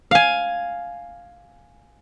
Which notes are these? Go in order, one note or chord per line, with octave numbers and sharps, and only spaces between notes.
F5 G#5